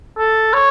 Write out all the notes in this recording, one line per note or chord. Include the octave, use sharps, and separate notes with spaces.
A4
C#5